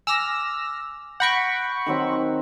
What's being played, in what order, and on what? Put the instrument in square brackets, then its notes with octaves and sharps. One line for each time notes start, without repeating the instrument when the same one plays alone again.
[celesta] G#5 D6 [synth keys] E6 F6 A#6
[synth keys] F#5 B5 C#6 [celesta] G6 A#6 D7
[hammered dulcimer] D#3 F#3 C4